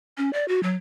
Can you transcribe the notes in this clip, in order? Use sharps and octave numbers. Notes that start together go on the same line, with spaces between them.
C#4
D5
F#4
F#3